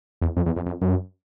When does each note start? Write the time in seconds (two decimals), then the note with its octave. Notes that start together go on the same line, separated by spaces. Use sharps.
0.21 E2
0.37 F2
0.46 E2
0.56 F2
0.66 F2
0.82 F#2